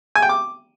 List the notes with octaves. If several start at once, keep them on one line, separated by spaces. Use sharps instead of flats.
G#5
G5
D6